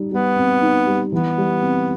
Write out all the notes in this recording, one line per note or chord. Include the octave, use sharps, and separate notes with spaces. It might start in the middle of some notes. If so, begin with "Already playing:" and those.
Already playing: G3 D#4
G3 B3
C4
D#4
G3
E3 B3
G3
C4